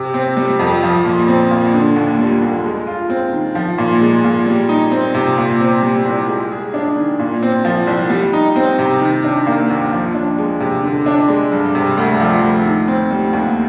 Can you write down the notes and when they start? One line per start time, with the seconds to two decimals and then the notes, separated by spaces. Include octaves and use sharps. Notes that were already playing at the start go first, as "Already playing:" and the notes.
Already playing: C3
0.14 C4
0.37 G3
0.60 F2
0.83 F3
1.05 A#2
1.28 C4
1.51 A#2
1.74 D3
1.96 D#2
2.19 G3
2.42 D#2
2.64 G#3
2.87 F4
3.10 C4
3.32 D#3
3.55 F3
3.78 A#2
4.01 G#3
4.24 A#2
4.47 G3
4.69 D#4
4.92 C4
5.15 C3
5.38 A#2
5.60 C4
5.83 G3
6.06 C2
6.28 G#3
6.51 G#4
6.74 D4
6.96 D#3
7.19 A#2
7.43 C4
7.65 F3
7.87 C2
8.10 G3
8.33 D#4
8.56 C4
8.79 C3
9.01 D#3
9.24 D4
9.47 A#3
9.70 D#2
9.93 F3
10.14 D4
10.38 G#3
10.60 C3
10.83 D3
11.06 D4
11.29 G#3
11.52 G2
11.75 C3
11.97 D2
12.20 F3
12.43 D2
12.65 D#3
12.88 C4
13.11 G3
13.33 D#2